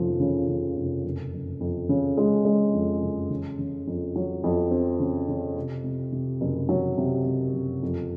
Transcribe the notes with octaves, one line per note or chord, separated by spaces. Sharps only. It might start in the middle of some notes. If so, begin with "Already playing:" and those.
Already playing: F1 D#2 C#3 F3
C#3
C#3
F1
F#1
F#1
F2
C#3
G#3
G#3
F2
F#1
C#3
C#3
F2
F#3
F2
C4
C#3
C#3
C3
C3
C3
F#1
F#3
C3
C3
F#1
F2